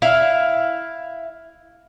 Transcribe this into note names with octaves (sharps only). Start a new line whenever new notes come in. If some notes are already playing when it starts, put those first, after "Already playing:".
E4 F5